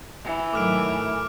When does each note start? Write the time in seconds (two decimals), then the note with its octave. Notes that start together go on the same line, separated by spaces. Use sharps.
0.24 E3
0.53 G#2 D#3 F#3 A3 D6 F6 D7